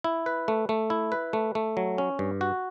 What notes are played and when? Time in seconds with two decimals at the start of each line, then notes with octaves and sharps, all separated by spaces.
0.04 E4
0.26 B4
0.48 A3
0.69 A3
0.90 E4
1.12 B4
1.33 A3
1.55 A3
1.77 F#3
1.98 C#4
2.19 G2
2.41 F#4